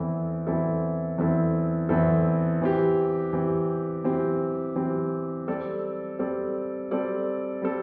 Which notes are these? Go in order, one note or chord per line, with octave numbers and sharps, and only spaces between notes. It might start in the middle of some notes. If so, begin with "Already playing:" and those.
Already playing: E2 E3 C4 E4 A4
E2 E3 C4 E4 A4
E2 E3 C4 E4 A4
E2 E3 C4 E4 A4
E3 C4 G4
E3 C4 G4
E3 C4 G4
E3 C4 G4
G3 C4 A4 D5
G3 C4 A4 D5
G3 C4 A4 D5
G3 C4 A4